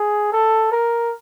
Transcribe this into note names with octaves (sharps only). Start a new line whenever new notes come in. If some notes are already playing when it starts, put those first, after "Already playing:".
Already playing: G#4
A4
A#4